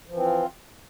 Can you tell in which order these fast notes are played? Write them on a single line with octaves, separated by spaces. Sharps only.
F3 E3 C4 F4